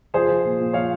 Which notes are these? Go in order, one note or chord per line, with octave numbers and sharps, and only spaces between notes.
F3 G#4 C5
F3
A#2
A#2
F3 C#5 F5